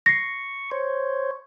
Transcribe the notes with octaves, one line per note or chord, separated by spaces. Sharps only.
C#6 A#6 C7
C5 C#5